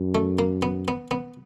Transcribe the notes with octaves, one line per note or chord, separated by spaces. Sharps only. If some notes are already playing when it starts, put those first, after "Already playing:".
Already playing: F#2
A3
A#3
B3
B3
B3